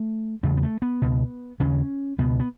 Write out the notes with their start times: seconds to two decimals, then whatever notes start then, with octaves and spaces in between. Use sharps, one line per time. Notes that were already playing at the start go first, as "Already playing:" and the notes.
Already playing: A3
0.43 E2 C#3 A3
0.57 B3
0.63 A3
0.82 B3
1.02 C#2 B2
1.60 D#2 C#3 C#4
2.18 C#2 B2 B3
2.40 B3